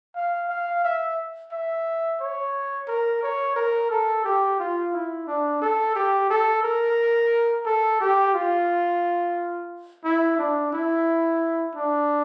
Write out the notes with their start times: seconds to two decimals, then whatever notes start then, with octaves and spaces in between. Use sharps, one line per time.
0.16 F5
0.50 F5
0.84 E5
1.52 E5
2.21 C#5
2.88 A#4
3.23 C#5
3.56 A#4
3.90 A4
4.24 G4
4.59 F4
4.93 E4
5.27 D4
5.62 A4
5.95 G4
6.30 A4
6.63 A#4
7.66 A4
8.00 G4
8.34 F4
10.04 E4
10.39 D4
10.73 E4
11.75 D4